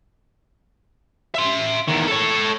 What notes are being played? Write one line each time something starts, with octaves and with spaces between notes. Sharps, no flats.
E5 C6
E2 D#3
A4 C#5